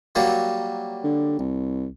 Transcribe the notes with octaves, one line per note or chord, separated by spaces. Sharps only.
F#3 G3 A#3
D3
C2